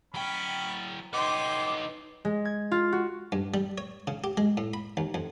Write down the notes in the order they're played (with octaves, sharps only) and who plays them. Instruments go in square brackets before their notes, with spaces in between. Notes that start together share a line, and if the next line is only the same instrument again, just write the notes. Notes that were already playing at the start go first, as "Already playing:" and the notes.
[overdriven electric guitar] F#3 G5 [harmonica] C#4 B5
[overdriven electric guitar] B3 D#4 [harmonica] G5 C6 [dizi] D6
[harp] G#3
G#6
F4
F#4
[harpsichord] G2
G3
C#5
C#3
G4
G#3
A2
B5
D#2
F2